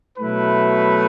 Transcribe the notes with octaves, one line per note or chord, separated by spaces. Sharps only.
B2 F#3 A3 E4 B4